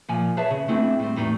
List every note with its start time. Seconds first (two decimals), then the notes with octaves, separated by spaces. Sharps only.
0.09 A#2 F3 G#5
0.37 G#4 B4 C#5 E5 A5
0.51 C#3
0.68 A3 B3 C4 D4 E4 G#4
0.99 A2 G3 C4
1.16 E2 A2 D#4 F#4